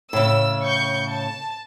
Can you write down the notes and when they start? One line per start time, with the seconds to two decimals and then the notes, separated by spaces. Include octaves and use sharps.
0.13 A2 C#3 E6
0.63 C#6 G6
1.08 A5